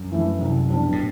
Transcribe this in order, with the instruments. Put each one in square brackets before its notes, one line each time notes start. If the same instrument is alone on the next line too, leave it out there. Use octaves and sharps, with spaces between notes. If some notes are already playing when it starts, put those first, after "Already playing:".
Already playing: [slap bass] F#2
[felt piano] E3 A3 E4
C2
B2 G3 D4
[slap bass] A2